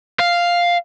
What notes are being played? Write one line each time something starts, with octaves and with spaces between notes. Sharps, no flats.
F5